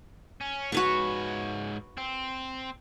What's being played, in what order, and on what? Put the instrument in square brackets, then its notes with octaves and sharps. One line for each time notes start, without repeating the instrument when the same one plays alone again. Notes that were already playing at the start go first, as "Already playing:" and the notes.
[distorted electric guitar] C#4
[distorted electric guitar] G#2 C#5 [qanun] F#4 B4 C#6
[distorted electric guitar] C4